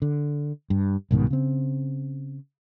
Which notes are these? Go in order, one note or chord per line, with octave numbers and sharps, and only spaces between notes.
D3
G2
C2 G#2 B2 D#3
C#3 C4